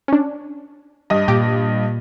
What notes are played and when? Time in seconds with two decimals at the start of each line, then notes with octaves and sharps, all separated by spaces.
0.08 C#4 D4
1.10 G2 D#5 D#6
1.28 A#2 G4 D6